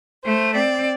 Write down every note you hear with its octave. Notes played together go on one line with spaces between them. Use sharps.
A3 C5
C4 D5